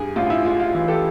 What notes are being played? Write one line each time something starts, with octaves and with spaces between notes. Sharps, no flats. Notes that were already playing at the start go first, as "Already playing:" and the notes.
Already playing: G2 G#4
A1 F4
E4
G#3 F4
F4
E3
G4 A4